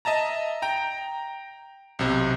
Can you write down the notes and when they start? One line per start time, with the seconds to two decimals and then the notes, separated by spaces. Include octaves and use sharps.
0.05 D#5 E5 A5 A#5
0.62 G5 A#5
1.99 B1 C3